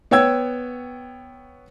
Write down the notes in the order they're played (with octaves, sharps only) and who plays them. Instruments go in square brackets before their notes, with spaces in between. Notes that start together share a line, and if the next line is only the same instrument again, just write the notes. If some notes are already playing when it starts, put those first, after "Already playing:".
[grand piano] B3 C#5 G5 E6 G#6